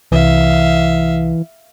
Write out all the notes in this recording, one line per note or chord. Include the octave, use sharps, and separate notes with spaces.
C2 E3 E5 F5